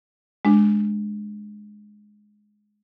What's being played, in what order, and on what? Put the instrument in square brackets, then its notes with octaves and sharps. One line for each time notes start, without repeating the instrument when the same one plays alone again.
[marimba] G#3 D4